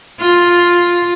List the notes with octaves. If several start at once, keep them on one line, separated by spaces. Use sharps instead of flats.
F4